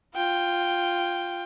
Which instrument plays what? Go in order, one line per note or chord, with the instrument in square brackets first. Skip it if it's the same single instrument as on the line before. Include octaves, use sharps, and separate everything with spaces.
[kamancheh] F4 G5